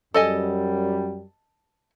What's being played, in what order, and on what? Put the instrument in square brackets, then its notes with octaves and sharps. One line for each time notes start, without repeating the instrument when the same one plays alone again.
[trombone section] F#2 G3 [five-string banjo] A4 D#5 G#5